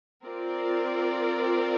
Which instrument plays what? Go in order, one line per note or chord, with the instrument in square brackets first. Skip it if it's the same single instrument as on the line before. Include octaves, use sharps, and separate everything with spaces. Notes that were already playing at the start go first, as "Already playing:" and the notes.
[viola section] C4 F4 A#4 D5